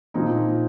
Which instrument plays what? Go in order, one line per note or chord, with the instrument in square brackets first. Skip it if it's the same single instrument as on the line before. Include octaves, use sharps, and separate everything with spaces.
[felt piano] A#2 F3 C4 D#4